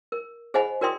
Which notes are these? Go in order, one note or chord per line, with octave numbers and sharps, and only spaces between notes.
A#4
G#4 C5 D#5 F#5 G#5 B5
F#4 A#4 D5 G5 C6 D#6